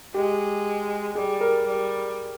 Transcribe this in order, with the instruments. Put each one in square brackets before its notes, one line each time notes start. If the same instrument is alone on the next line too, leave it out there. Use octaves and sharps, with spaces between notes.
[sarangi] G#3 [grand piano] G4
[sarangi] G3 [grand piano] G#4
[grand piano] A#4
[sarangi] G3